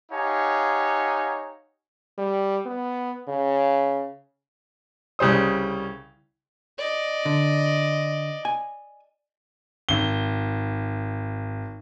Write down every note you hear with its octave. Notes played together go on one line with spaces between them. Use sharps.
D#4 G4 C#5 F5 F#5 G#5
G3
B3
C#3
C2 C#3 G3 C5 D#6
D5 D#5
D3
G#5
G#1 G7